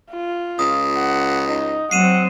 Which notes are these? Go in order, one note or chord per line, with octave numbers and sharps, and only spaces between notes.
F4
C#2 D#6
F#5
D#4
F#3 C4 F#5 C7 D#7 E7